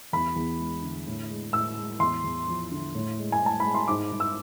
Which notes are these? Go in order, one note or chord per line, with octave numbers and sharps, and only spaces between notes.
E2 B5
E2
G#3
D3
A2
G#3
A2 E6
G#3
E2 C6
E2
F3
D3
A2
G#3
G#5
A2 A5
G#3 B5
C6
G#2 D6
G#2
E6